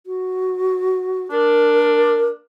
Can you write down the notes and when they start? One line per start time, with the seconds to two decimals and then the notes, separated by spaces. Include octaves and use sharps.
0.06 F#4
1.31 D4 A#4